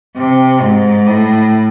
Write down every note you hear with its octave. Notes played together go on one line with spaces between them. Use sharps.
C3
G#2
A2